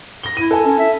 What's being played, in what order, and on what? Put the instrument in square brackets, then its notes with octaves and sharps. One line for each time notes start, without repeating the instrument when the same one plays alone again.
[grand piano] A#6 G7
[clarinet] E4 [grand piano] D#7
[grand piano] A4 G#5
[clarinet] C#4
E5